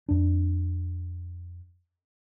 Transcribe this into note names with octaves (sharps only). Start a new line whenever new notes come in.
F2 D4